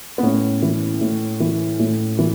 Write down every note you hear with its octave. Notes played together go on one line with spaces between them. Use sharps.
B3
A2 C#4
E3
A2
E3
A2
E3